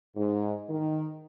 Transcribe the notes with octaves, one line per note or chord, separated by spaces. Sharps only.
G#2
D#3